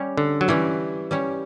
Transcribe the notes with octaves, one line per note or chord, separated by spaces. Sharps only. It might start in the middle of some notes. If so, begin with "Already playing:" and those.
Already playing: G3 C#4 G4 C#5
D3
F#3
E3 G3 C#4 G4 C#5
G3 C#4 G4 C#5